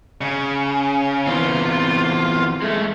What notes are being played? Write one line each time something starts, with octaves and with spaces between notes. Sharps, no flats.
C#3
E3 B3 C4 F4
G#3 A3